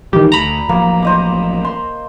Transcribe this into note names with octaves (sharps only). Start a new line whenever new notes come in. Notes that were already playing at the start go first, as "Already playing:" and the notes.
A2 D#3 E3 G3 G4
D2 A#5 B5
A1 F3 F#3 A#3
C5 D#5 D6
C6